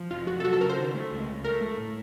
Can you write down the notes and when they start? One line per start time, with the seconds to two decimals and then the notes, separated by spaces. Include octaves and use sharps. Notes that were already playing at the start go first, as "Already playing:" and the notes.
Already playing: F3
0.11 F1 F4
0.27 F1 F#4
0.40 A4
0.44 F#3 F#4
0.53 A4
0.61 C#3 A#4
0.69 C5
0.77 D#3
0.94 A3
1.11 C#2
1.28 C#2
1.44 A3 A#4
1.61 A3
1.78 A2